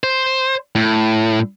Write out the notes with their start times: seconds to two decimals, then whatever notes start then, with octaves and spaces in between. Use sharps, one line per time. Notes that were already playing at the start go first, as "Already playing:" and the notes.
0.04 C5
0.75 A2